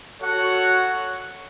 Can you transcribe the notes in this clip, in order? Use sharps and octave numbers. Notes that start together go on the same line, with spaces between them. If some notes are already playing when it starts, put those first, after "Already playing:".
F#4 A4 C#5 F#5